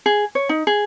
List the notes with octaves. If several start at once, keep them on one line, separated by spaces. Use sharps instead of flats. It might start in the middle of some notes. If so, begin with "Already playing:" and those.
G#4
C#5
D#4
G#4